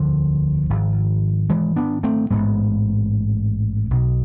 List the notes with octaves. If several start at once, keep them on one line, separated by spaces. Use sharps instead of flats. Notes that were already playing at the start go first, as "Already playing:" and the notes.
Already playing: E1 D2 D3 F3
G#1 G#2
E3 G#3
B3 D4
A3 C4
A1 G#2 G#3 B3
B1 B2